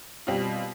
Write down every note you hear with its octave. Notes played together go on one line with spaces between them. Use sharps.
B2 G3 C4 F4